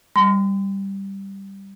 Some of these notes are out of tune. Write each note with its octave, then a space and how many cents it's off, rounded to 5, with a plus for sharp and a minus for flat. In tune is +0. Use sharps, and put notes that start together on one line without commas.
G3 +0 C6 -40